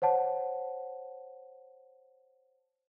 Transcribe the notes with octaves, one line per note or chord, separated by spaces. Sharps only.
C5 C#5 F#5 A5